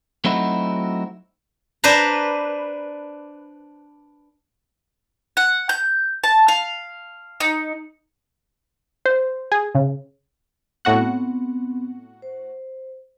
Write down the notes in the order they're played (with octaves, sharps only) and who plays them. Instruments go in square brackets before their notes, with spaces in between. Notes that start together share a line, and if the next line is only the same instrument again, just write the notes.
[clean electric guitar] F#3 A3 C4 D#4 E4 F#4
[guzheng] D4 B4 C5 A#5
[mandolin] F#5
G6
A5
F5
D#4
[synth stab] C5
G#4
C#3
[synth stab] A2 F#4 F#5 [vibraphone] B3 C4
[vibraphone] C5